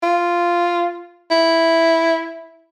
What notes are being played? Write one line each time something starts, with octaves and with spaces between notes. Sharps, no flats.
F4
E4